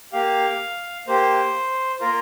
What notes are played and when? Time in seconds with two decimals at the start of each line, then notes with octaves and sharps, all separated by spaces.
0.12 A#3 G4 F5
1.07 A#3 G4 C5
2.01 A#3 F4 A#4